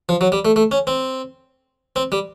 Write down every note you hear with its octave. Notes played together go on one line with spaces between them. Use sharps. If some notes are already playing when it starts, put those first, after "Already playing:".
F3
F#3
G3
A3
A3
C#4
C4
C4
G3